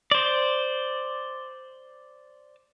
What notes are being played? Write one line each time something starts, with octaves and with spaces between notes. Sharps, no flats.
C5 D5